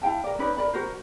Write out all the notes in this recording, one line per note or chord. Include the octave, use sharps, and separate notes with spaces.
E4 F5 G5 A5
A#4 D5
C#4 D#4 B4 D5
A#4 D5 B5
F#4 A#4 C5